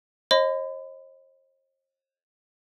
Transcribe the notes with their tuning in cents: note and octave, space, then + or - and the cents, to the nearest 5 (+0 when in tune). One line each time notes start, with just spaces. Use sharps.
C5 +45 D#5 +0 B5 +45